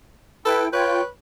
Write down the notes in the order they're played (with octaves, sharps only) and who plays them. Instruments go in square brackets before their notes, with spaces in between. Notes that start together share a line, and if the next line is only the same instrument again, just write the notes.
[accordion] E4 G5 [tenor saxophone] A4 [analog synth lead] B4
[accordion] F4 G5 G6 [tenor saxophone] B4 [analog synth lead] C#5